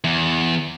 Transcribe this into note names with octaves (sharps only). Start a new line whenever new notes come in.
E2